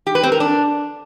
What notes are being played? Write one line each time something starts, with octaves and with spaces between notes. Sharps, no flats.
G4
B4
C4
A#4
D4